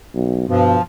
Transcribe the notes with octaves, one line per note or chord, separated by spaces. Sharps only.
B1
G2 B2 F3